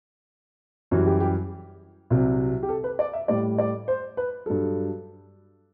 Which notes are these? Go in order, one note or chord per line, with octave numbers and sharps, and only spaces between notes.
F#2 E3 G3 F#4
G4
G4
C2 C3 F#3
G4
A4
B4
D5
E5
A2 G3 D5
D5
C5
B4
G2 F#3 A4